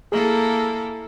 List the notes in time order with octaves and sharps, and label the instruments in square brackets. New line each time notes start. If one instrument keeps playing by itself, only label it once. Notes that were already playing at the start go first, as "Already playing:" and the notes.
[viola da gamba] A#3 E4 A4 [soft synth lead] G#4